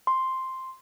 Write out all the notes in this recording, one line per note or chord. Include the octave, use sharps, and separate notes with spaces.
C6